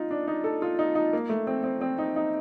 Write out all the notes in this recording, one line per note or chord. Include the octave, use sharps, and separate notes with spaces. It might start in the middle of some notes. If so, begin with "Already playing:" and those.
Already playing: D#4 F4
D4
D#4
A4
F4
D#4
D#4
A#3
A3
C4
C4
C4
D#4
D#4